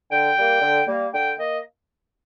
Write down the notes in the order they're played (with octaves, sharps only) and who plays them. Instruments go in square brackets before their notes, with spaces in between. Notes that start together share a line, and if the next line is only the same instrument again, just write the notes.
[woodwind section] D3 G5
G3 A#3
D3
G3 A#3
D3 G5
A#3 D#5